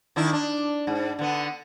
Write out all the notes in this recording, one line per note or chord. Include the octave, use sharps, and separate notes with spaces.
D#3 D4 E4
D4
G#2
D3 B3